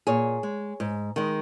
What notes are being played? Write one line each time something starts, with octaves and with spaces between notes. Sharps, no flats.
A#2 G#4 C#5
G#3
G#2
D#3 G#3